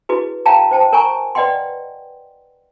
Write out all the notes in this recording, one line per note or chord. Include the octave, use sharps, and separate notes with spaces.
E4 F#4 G#4 B4
C#5 F5 G5 A5 A#5
C5 G5 A5
A#4 C#5 G#5 A#5 C#6
B4 D5 D#5 F#5 G5 C6